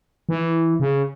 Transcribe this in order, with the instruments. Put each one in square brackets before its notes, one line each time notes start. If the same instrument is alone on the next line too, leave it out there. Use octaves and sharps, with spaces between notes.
[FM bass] E3
C#3